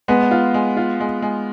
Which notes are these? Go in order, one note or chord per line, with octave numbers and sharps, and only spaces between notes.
G#3 B3
F4
G#3
F4
G#3
G#3